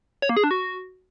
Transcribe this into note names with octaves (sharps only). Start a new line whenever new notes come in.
C#5
A#3
G#4
D4
F#4